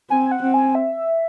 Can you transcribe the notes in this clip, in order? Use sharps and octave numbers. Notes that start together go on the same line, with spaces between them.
C4 G#5
F#5
C4
G#5
E5